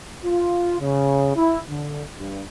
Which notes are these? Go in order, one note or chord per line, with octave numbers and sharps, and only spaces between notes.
F4
C#3
E4
D3
G2